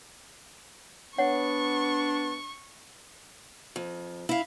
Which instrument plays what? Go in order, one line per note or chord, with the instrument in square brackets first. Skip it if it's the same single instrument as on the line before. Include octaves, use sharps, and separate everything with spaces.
[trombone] B3 [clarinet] D4 [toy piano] C#5 F#5 [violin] C#6
[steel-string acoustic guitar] F2
E4 F5